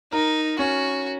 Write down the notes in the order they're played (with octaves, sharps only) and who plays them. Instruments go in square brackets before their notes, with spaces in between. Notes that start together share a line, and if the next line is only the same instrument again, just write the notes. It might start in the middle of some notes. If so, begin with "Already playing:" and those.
[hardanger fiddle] D#4 [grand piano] A#4
[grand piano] C#4 [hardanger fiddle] F#4